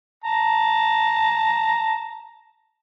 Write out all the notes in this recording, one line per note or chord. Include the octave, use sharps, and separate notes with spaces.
A5 A#5